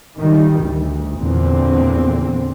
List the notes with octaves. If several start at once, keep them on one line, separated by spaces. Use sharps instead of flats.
D#3 G3
D2
E2 A#2 D3 C4